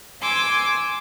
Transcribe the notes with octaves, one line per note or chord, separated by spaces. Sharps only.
G#5 C6 D6 E6